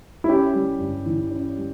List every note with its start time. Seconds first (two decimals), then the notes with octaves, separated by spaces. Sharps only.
0.24 E4
0.28 C#4 G4
0.54 G3
0.80 G2
1.06 E3
1.31 C#4
1.57 G3